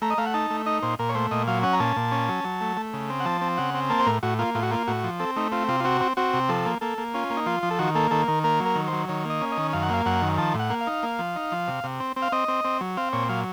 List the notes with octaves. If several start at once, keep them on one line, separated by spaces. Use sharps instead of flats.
A3 A#5
D#5
A3 F5
F#5
D#4 A5
A3
D#4 D#5
A#2 C5
A#2 A#4
C#5
A3 C5
A#2 D#5
F#3 F5
C#4 F#5
A#5
A#2 A5
A#2
C#4
F#3
F#3
A3
A3
C#3
C4
F#5
F3 A5
C4
C#3 F#5
C4
A#3 A5
C5
A2 A#4
A2 F#4
A#3 F4
A2 F4
F#4
A#3 F4
A2 F#4
F3
C4 A4
A3 D#4
C4 F4
C3 F4
F4
C4 F#4
C4
C4 F#4
C3
F3 A4
A#3
A#3 A4
A#3
C#4 F4
A#3
D#4
F3 F4
F3
A4
D#3 F#4
A#3 A4
D#3 A4
D#3 A#4
A#3 A#4
F#3
A#4
D#3
C5
F#3
D#3 C#5
A#3 D#5
C#4
D#5
D#3
F#2 F5
F#5
A#3 F5
F#2 F#5
D#3
F3 A5
A2
F#5
A#3
F5
D#4
A#3
F3
D#4
F3
C3
C3
C4
C4
F5
C4 D#5
C4
C4
F#3
C4 F5
A#2 C#5
F#3 F5